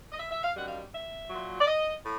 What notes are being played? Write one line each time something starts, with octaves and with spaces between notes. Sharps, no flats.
D#5
E5
E5
F5
F#2 D#3 G3 F#5
F5
E5
A#2 F#3
D5
D#5
A2